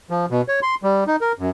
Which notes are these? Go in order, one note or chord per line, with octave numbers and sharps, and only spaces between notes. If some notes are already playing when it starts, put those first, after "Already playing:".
F3
B2
C#5
C6
G3
D#4
A#4
F#2